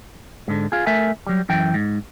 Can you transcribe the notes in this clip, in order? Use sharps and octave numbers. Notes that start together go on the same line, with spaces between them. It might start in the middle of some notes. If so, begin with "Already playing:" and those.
G#2 D3
F4 G#4
A3 A#4 E5 G#5
F#3 G3
F#2 E3 G5
G#2